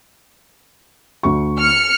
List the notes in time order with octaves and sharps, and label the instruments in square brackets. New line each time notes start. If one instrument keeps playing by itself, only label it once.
[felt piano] D2 C#6
[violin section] F6 C#7